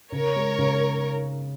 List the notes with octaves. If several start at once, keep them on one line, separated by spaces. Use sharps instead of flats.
C#3 A#4 C#5
G#3
C#3